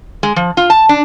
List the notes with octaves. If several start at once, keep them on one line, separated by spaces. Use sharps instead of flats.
G#3
F3
F4
A5
D4